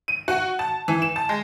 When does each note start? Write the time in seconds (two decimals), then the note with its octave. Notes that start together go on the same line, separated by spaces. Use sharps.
0.08 D#7
0.28 F#4
0.59 A5
0.88 E3
1.02 E7
1.16 A5
1.29 G#3